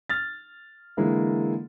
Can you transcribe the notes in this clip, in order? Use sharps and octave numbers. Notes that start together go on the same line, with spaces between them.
F6 A6
D3 E3 G#3 A#3 E4